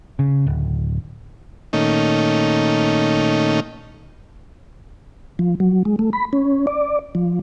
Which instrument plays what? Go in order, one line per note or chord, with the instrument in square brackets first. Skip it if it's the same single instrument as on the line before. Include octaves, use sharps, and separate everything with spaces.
[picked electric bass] C#3
D1
[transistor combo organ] A#2 D#3 A3 C#4 D#4
[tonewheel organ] F3
F#3
G#3
A3
B5
C#4
D5
F3